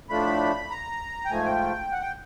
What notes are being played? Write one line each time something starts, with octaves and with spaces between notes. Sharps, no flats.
A2 F3 A3 D4 B5
A#5
G5
G#2 F3 A3 G#5
G5
F#5
G5